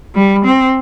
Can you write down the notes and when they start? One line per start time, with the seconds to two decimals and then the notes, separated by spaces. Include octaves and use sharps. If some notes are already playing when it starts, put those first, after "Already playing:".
0.15 G3
0.45 C4